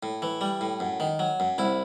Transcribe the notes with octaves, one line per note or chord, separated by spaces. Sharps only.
A2
E3
G3
A2
F#2
D#3
F#3
F#2
C2 E4